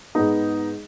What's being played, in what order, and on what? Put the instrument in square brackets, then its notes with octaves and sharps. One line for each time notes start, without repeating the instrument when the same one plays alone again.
[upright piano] G#2 G#3 B3 D#4